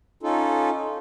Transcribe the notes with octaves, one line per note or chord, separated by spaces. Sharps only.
C#4 D#4 F4 A4